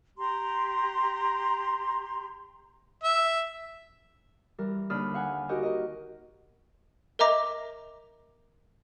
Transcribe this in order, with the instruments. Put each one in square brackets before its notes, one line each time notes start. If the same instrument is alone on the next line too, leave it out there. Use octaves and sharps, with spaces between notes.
[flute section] G4 A#5 C6
[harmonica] E5
[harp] E3 G3 A#4
D#2 D3 D4 B5 D#6 F6
F5 F#5 G#5
D#4 F#4 G4 A#4 D#5 G5
A#4 D#5
[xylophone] A#4 D#5 E5 A#5 D6 A#6